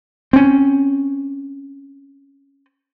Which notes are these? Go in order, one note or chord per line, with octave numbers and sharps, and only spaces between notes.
C4 C#4